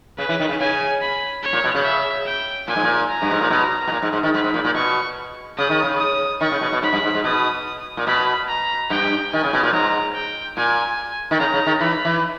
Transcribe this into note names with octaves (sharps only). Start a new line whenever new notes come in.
C#3 B4
E3
D#3
C#3
C#3 G#5
B5
C#5
A#2
B2
C#3
E5
G5
A#2 G#5
G#2
A#2
A#5
G2
G#2
A#2
B2
B2
A#2
G#2
G#2
D#3
G#2 B5
G#2
A#2
A#2
B2 C#6
C#3 D#6
D#3
C#3
D#6
D#3 C#6
C#3
B2
B2
G#2 B5
G2
G#2
G#2
B2 D#6
A#2
B2 B5
A#5
G2 G5
D#3 G#5
C#3
B2
A#2
G#2 A#5
G5
A#2 G#5
D#3
C#3 A#5
C#3
D#3
E3 B5
E3